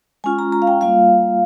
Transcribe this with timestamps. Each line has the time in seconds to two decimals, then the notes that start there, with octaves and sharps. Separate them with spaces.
0.24 G#3 C#4 F4 G#5
0.39 A#5
0.52 A#5
0.62 F5
0.67 G5
0.81 G3 A#3 F4 F5